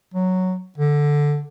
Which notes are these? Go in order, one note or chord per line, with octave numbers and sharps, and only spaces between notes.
F#3
D3